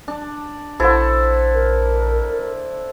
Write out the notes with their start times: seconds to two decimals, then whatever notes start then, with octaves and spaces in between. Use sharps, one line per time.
0.08 D4
0.80 A#1 E4 A4 C5 F#5
1.54 A#4